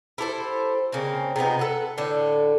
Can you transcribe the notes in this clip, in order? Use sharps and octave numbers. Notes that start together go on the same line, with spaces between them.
E4 G4 A4 C5
C#3 A#3 C4
C3 F3 B3 D#4
A4 B4 F#5
A2 D3 A4